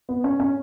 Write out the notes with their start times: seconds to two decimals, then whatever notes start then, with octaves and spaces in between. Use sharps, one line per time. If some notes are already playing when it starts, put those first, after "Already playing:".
0.09 B3
0.24 C#4
0.40 C#4